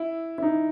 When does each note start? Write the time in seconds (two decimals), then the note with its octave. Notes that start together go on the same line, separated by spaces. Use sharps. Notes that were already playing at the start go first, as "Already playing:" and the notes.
Already playing: E4
0.38 E4
0.43 D#4